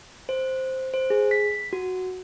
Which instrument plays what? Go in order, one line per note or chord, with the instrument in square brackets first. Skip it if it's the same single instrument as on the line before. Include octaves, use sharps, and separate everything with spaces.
[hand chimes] C5
C5
G#4
B6
F#4